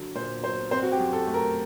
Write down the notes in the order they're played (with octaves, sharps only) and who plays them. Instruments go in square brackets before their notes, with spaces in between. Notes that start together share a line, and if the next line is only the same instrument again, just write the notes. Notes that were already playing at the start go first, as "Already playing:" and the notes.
Already playing: [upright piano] D3 F#3
A#2 C5
F#3 C5
C4 C5
F#4
G4
F#2
A4
A3
A#4